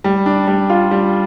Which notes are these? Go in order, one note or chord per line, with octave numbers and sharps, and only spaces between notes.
G3
D4
G3
F4
G3